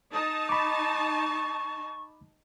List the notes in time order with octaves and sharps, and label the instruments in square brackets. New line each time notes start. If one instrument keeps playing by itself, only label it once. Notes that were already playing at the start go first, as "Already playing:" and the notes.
[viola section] D#4 A5 [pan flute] D#6
[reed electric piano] B5 D6 [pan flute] C#6